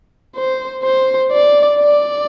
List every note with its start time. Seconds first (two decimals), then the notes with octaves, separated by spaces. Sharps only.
0.36 C5
0.84 C5
1.32 D5
1.80 D5